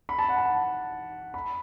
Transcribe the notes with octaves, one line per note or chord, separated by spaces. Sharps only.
B5
A5
F#5
A5
B5